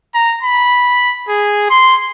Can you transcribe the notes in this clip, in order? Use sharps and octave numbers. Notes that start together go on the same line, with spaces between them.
A#5
B5
G#4
C6